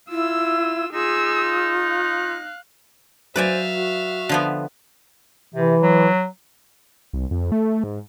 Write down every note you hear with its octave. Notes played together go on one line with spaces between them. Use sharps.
E4 F4 E6
D#4 F4 G#4 E6
F5 F#6
F#3 B4 C5 D5 E5 F5 G#5 A6
F#4
D3 F3 B3
C3 E3
F#3
C2
F2
A3
G#2